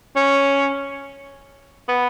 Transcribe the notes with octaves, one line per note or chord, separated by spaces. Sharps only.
C#4
B3